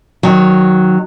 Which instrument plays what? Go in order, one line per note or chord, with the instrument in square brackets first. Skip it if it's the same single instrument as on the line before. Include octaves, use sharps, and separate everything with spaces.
[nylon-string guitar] D#3 F#3